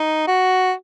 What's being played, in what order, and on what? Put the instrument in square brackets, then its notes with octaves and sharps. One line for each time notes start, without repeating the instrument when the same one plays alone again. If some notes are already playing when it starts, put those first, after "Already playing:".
Already playing: [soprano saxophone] D#4
F#4